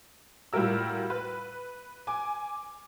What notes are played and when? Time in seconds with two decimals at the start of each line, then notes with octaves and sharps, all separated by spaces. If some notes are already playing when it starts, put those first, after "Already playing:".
0.53 A2 G3 F4 F#4 A#4 E6
1.10 B4
2.07 G#5 D6